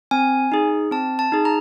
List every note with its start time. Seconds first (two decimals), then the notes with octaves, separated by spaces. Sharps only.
0.11 C4 G#5
0.52 D#4 G#4
0.91 C4 A5
1.19 A5
1.32 D#4 G#4
1.45 A#5